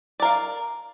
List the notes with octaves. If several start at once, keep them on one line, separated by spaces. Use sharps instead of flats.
A#4 D5 F5